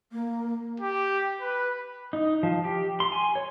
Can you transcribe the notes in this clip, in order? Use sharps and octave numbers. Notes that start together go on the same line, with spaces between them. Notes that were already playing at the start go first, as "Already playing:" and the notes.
A#3
G4
B4
D#4
F3
G4
C6
G#5
C#5